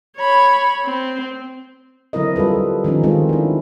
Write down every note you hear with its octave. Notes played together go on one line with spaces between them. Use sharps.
C#5 B5
C4
D3 F#3 C4 E4 A#4 D#5
G3 F4 A4 B4
D#3 F3 C4 C#4 D#4
D#3 G#3 C4 D#4 F4 A4
D4 E4